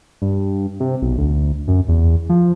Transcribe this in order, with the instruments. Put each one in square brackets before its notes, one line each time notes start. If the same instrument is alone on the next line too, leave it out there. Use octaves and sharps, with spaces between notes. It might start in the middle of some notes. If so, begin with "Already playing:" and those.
[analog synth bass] G2
C3
B1
D2
F#2
E2
F3